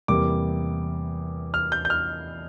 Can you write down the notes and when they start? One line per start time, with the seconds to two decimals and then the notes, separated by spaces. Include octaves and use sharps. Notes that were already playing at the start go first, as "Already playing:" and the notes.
0.08 E2 C3 G3 A#3 D6
1.54 F6
1.72 G6
1.85 G6
1.90 F6